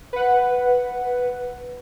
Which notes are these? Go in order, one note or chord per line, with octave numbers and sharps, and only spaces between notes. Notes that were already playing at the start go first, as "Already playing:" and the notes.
B4 F#5